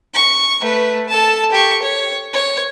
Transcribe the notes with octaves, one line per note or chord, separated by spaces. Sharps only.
C#6
A3 B4
A4 A5
G4 C#6
C#5
C#5